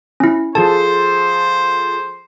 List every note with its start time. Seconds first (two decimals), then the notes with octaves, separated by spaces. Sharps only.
0.20 C#4 E4
0.55 F3 G#4 A4 C5 A5